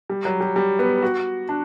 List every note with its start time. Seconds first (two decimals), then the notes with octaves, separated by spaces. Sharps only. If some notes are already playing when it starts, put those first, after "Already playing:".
0.10 G3
0.25 F#3
0.40 G3
0.56 G3
0.79 B3
1.02 F#4
1.49 D4